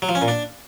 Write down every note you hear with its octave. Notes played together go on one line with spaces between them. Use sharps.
F#3
F3
C#4
A#2
D4